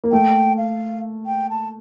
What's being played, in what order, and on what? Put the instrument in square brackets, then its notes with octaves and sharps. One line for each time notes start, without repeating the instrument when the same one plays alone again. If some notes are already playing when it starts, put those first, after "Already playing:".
[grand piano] A#3
[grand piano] A3 [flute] G5
[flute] F5
G5
A5